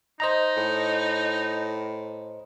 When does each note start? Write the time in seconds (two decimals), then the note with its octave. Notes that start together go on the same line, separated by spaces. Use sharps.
0.20 D#4 C5 D#5 A#5
0.57 A2